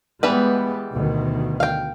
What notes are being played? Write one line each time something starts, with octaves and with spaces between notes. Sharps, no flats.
E3 G3 G#3 B3 B4
D2 B2 D#3
F5 G5